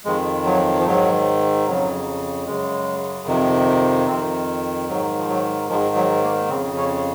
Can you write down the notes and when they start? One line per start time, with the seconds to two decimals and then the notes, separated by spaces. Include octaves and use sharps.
0.05 F2 D#3 G#3
0.46 F#3
0.80 F3
0.86 G#2 D#3 F#3
1.67 F2 C#3 F#3
2.46 F#2 C#3 G#3
3.27 F2 C3 D#3
4.08 F2 D#3 C4
4.89 G#2 D#3 F#3
5.18 F3
5.29 F#3
5.69 G#2 D#3 F3
5.95 F#3
6.23 A#3
6.49 C#3 C4
6.54 F2
6.76 C#4